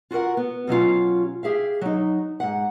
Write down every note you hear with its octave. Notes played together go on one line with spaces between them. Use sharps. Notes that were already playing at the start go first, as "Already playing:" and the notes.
F4 F#4 A4 A#4 F#5
B3
B2 F#3 C#4 F4
G4 G#4 E5 F5
F#3 D#4
G#2 F#5